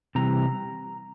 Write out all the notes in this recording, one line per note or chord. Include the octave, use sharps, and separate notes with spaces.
C3 E3 G3 C4 A#5